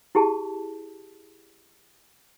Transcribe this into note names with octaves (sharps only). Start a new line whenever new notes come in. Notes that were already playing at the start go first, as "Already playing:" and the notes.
E4 G4 G#4 A5